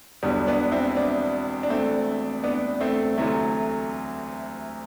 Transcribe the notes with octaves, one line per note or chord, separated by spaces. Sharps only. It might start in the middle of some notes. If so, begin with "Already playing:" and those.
E1 E2 D3 G3 B3
B3 D4
C4 E4
B3 D4
D4
A3 C4
B3 D4
A3 C4
D2 C3 E3 F#3 A3